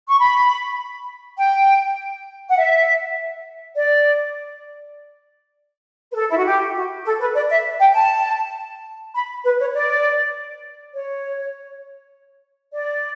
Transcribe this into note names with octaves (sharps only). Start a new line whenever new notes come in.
C#6
B5
G5
F#5
E5
D5
B4
A4
E4
F#4
G4
F#4
A4
B4
D5
E5
G5
A5
B5
B4
C#5
D5
C#5
D5